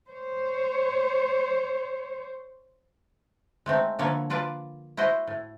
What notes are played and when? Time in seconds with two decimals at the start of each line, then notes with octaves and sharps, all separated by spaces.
0.10 C5 C#5
3.66 G#3 A3 C4 D#4
3.99 D3 F3 A#3 A4 B4 C#5
4.30 A#3 F4 B4 D5 A5
4.97 E4 F#4 C5 D#5 F#5
5.27 A2